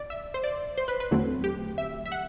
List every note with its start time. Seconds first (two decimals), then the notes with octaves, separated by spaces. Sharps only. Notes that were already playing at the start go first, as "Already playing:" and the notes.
Already playing: D5
0.10 E5
0.34 C5
0.44 D5
0.78 C5
0.88 B4
1.00 B4
1.11 E2 D3 F#3 A3 C4
1.44 G4
1.78 E5
2.06 E5
2.12 F#5